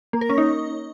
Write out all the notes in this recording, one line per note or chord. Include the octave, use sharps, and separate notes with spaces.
A#3
A#4
C#4
D#4